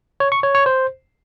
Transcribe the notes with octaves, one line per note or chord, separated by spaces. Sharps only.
C#5
C#6
C#5
C#5
C5